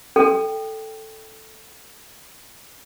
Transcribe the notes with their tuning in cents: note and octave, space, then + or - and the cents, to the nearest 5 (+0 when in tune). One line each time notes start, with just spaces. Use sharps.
A4 +0 G5 +0